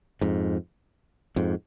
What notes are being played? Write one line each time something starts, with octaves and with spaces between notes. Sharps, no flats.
F2 G#2
F2 G#2